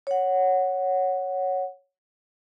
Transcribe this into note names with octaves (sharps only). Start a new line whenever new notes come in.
C#5 F#5